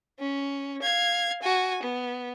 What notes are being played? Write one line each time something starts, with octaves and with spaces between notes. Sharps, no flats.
C#4
F5 G#6
F#4 G#5
B3